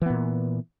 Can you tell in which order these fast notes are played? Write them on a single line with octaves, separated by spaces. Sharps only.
E3 B3 A#2